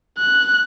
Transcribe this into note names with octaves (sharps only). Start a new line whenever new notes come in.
F#6